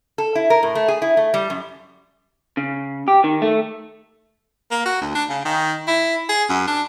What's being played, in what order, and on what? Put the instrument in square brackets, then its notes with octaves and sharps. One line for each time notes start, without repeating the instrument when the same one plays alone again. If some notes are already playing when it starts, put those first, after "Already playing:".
[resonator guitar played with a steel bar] A4
E4
A#4
A2
A3
G#4
E4
A3
G3
F#2
[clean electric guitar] C#3
G4
D#3
A3
[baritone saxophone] A#3
F#4
D2
D4
C#3
D#3
E4
G#4
F#2
D4